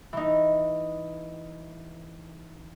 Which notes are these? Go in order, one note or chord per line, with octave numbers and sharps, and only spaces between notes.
E3 D#4